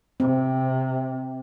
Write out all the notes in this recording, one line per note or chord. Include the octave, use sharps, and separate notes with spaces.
C3 C4